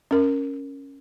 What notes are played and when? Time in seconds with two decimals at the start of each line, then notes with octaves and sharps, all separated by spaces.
0.11 C#4 A#4